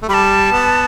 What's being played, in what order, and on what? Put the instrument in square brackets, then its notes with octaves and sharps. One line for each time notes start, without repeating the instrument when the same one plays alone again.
[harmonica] A3
[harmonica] G3 [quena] B5
[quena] A5
[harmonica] B3